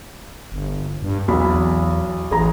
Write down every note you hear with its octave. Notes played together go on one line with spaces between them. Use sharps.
G1
G2
B1 E2 F#3 B5
A1 G#4 A#5